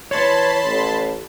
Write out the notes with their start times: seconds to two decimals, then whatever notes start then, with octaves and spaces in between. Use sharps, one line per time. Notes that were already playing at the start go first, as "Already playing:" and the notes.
0.11 E3 C#5 A5 B5 C6
0.63 A1